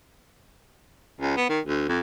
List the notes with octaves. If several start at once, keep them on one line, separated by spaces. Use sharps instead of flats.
C#2
B3
D#3
D2
F2